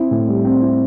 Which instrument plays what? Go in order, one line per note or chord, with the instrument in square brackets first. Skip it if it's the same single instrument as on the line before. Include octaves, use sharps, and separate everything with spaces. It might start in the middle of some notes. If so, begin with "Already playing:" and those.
Already playing: [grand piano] C4 E4
A2
G3
C4
E4